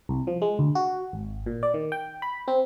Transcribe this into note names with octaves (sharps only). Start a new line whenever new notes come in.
C2
F3
G#3
D2
F#4
G#1
A#2
D5
D#3
G5
B5
C4